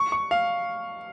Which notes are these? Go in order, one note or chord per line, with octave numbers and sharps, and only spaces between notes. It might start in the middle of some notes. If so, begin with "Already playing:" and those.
Already playing: C#6
C#6
F5